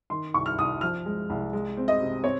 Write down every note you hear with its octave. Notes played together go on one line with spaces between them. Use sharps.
D#3 C6
C2 C#6
F6
C2 D#6
F3 F6
G#3
C2
G#3
C4
D#5
C3
C4 C#5